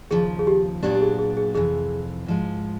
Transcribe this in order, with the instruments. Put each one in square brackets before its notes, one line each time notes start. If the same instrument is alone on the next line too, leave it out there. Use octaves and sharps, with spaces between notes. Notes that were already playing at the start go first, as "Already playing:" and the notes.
[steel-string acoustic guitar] D#2 C#3 F3 [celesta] G#4
[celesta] G#4
G4
[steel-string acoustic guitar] A#2 F#3 B3 D4 [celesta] G4
[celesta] G4
G#4
G#4
G#4
[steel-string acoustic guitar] F2 C3 E3 [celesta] G#4
[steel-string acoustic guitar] G#2 F3 G#3